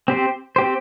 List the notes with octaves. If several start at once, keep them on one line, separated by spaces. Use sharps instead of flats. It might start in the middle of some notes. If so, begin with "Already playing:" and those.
C4 G4 C5
C4 G4 C5